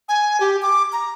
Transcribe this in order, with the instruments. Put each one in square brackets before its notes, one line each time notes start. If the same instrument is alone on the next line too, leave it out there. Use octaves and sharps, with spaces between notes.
[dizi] G#5
G4
D6
A#5